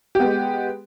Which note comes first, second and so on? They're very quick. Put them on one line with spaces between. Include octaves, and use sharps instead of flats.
G4 B3 G#3